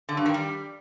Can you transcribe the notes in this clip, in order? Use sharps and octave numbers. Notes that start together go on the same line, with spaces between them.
D3
G2
D#3
G3